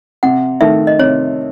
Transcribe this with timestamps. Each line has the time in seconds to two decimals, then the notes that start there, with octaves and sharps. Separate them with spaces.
0.23 C3 F#5
0.61 D#3 A3 E5
0.87 D#5
0.99 C3 C#5